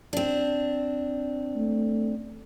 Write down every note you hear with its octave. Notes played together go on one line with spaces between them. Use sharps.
C4 D4
A3